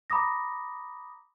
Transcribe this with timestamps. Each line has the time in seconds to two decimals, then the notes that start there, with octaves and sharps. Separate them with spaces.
0.10 A#5 B5 D6 D#6 A#6